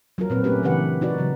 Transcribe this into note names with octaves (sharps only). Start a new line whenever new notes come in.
F#3 F4 A#4
A#2 C4 B4
A3 C#4 G4 B4
C#3 E3 D4 G4 B4 F#5
D#4 F#4 B4 D5
C#3 F#3